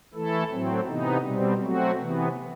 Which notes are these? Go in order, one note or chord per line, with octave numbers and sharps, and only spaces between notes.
E3 A3 E4 A4
A2 F#3 C4
C3 E3 B3 D#4
B2 G3 C4
F#3 A3 C4 F#4
C3 E3 B3